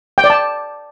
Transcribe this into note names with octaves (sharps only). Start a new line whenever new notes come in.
G5
D5
A5